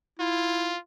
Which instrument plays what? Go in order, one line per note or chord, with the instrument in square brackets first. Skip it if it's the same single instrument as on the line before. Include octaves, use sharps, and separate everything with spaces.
[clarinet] E4 [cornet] F4